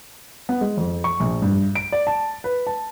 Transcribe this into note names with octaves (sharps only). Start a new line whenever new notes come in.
B3
G#3
F2
C#6
A#1
G2
D7
D5
A5
B4
A5